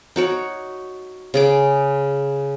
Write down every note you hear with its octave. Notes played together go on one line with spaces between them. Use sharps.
D#4 F#4 C#5
C#3 G#4 D6